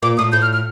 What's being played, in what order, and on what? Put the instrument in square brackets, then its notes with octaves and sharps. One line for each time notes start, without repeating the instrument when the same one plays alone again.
[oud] A#2 [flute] D6
[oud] A2 [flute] D#6
[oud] A2 [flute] G6
[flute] F6
F6